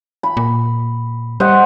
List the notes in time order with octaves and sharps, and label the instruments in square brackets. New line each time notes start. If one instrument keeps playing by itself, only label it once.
[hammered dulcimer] B5
[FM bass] A#2
[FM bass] G3 [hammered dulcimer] C5 D#5 F#5